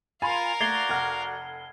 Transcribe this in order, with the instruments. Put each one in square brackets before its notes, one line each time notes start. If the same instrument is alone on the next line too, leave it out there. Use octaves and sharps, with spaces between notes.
[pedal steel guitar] F4 [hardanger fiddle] A#4 F5 [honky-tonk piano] G#5 B5 C6
[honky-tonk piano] A3 [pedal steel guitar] F#4 D5 [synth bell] G#6 C7 G7
[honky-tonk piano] F1 F#5 F6